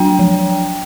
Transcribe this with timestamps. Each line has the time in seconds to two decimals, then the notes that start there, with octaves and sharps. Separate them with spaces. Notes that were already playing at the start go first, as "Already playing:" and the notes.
Already playing: F#3 D4 G5
0.19 F3